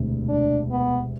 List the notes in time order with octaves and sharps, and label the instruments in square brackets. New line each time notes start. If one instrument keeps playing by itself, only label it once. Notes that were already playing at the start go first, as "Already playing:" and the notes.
Already playing: [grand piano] E1 D2 C3
[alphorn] D4
B3